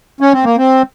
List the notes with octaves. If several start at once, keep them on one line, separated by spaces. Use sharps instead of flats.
C#4
C4
A#3
C4